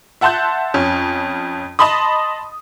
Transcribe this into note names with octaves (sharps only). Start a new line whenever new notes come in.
E5 F#5 A5 C6 F#6 G6
F2 C#4
D#5 A5 B5 C6 D#6